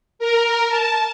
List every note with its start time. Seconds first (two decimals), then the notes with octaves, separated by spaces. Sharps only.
0.19 A#4
0.69 A5